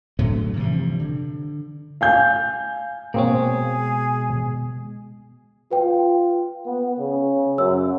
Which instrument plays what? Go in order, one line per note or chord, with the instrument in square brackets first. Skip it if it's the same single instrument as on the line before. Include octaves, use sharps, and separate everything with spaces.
[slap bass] A2 D3 F#3 A3
G2 C3 E3 F3
D3
[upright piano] F5 G#5 G6
[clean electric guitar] B2 G#3 [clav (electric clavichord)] A#3 C4 C#5 [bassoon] G#4
[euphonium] F4 [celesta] B4 G5
[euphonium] B3
C#3
[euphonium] F#2 [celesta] C#5 E6